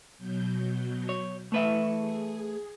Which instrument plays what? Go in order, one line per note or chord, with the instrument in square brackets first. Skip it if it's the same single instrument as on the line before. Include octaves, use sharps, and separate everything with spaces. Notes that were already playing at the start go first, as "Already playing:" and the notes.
[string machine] B2 F#3 G6
[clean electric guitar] C#5
[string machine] E3 C#6 [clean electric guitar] A3 B4 E5
[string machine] G#4